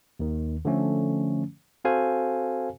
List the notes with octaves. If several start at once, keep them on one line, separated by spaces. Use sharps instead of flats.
D#2 D#3
D3 F3 A3 C#4
C4 F#4 A4 C5 F5 G#5